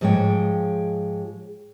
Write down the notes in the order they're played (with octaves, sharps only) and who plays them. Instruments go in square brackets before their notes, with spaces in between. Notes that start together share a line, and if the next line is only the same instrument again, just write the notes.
[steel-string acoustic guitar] G#2 F3 G#3 C#5 G5